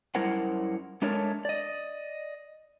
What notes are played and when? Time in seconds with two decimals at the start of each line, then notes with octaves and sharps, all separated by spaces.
0.15 F#2 G3 E4 A#4 C5 F#5
1.02 G#3 A3 D4 A4 A#4 C#5
1.45 D5 D#5